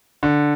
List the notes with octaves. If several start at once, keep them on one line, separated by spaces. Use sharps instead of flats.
D3